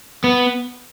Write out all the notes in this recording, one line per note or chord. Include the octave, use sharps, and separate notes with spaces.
B3